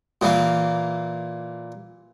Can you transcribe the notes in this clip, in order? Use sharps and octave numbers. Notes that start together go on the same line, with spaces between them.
A#2 E3 A#3